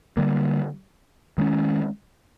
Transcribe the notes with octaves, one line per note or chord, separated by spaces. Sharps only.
D3 G3 A#3
D#3 G#3 C#4